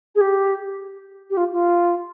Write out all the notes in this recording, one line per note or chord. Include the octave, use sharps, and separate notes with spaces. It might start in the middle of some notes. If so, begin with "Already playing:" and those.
G#4
G4
G4
F4
F4